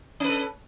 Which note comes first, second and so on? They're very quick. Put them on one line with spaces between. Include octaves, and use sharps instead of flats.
C#4 B4 A4